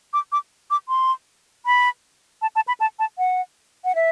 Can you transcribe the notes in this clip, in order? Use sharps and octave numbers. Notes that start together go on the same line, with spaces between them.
D6
D6
D6
C6
B5
A5
A5
B5
A5
A5
F#5
F#5
E5